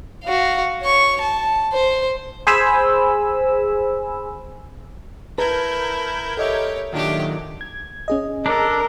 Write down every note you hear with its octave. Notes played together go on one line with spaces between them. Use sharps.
F#4 F5
C#5 C#6
A5
C5
G#4 C5 G#5 B5 E6
E4 A#4 B4 A5 A#5 G6 G#6
G4 A4 C#5 D#5 E5
A#2 D#3 F#3 D4 G4
G#6
C#4 G#4 D#5
D4 A4 A#4